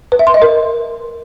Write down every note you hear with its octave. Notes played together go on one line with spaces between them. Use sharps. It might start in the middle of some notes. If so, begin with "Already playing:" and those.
B4
E5
C6
D#5
A#4